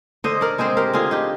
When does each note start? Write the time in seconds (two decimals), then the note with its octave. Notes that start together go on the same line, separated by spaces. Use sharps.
0.24 D3 C5 D#5
0.41 A#4 D5
0.58 G#3 C4 G#4 C5
0.77 G4 A#4
0.93 D3 F4 G#4
1.11 D#4 G4